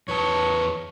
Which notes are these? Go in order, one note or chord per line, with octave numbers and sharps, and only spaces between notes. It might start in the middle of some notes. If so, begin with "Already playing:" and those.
E2 B4 C#5 A5